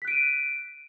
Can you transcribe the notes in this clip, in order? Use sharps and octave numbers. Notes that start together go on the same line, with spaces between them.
F#6 B6 D7 D#7